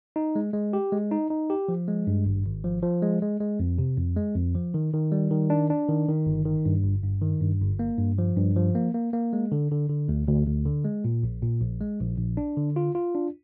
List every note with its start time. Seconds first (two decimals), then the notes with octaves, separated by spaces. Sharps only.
0.16 D#4
0.36 G#3
0.54 G#3
0.73 G4
0.92 G#3
1.11 D#4
1.30 D#4
1.50 G4
1.68 F3
1.88 G#3
2.07 G2
2.26 G#1
2.45 G#1
2.64 F3
2.83 F3
3.02 G#3
3.22 G#3
3.40 G#3
3.60 F2
3.78 C3
3.98 F2
4.17 G#3
4.35 F2
4.55 F3
4.74 D#3
4.94 D#3
5.12 G3
5.31 D#3
5.50 D4
5.70 D4
5.89 D#3
6.08 D#3
6.26 G1
6.45 D#3
6.65 G2
6.84 G1
7.03 G2
7.22 D#3
7.41 G2
7.61 G1
7.79 A#3
7.99 G2
8.18 F3
8.37 G2
8.56 F3
8.75 A#3
8.94 A#3
9.13 A#3
9.33 G#3
9.52 D3
9.71 D3
9.89 D3
10.09 D2
10.27 D2
10.46 D2
10.66 D3
10.85 G#3
11.05 A#2
11.23 A#1
11.42 A#2
11.61 A#1
11.81 G#3
12.00 A#1
12.18 A#1
12.37 D4
12.57 D3
12.76 F4
12.95 F4
13.15 D4